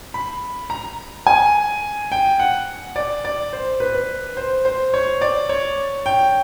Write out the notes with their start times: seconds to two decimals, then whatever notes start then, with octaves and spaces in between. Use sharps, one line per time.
0.14 B5
0.70 A#5
1.27 G#5
2.12 G5
2.40 F#5
2.96 D5
3.25 D5
3.53 C5
3.80 B4
3.95 B4
4.37 C5
4.65 C5
4.94 C#5
5.21 D5
5.49 C#5
6.06 G5